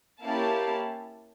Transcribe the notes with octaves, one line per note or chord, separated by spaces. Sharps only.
A#3 C#4 E4 G4 F5 A5